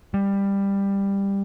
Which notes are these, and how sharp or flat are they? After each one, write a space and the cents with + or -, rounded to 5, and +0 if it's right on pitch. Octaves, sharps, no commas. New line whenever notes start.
G3 +15